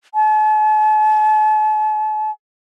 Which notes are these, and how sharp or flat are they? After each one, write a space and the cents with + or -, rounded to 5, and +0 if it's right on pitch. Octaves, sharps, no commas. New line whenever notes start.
A5 -45